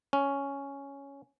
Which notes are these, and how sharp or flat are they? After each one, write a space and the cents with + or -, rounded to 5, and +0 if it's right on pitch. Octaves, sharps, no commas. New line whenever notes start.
C#4 +5